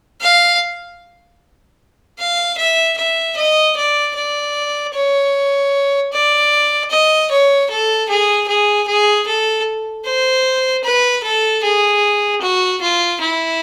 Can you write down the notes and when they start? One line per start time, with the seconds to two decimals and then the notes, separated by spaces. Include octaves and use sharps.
0.21 F5
2.19 F5
2.57 E5
2.98 E5
3.36 D#5
3.77 D5
4.15 D5
4.94 C#5
6.12 D5
6.90 D#5
7.30 C#5
7.70 A4
8.09 G#4
8.48 G#4
8.87 G#4
9.26 A4
10.06 C5
10.84 B4
11.23 A4
11.64 G#4
12.42 F#4
12.81 F4
13.20 E4